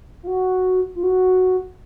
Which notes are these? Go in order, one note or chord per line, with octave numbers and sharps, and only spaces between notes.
F4
F#4
F4
F#4